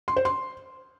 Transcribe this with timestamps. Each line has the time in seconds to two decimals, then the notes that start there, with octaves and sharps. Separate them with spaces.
0.08 C6
0.16 C5
0.25 C6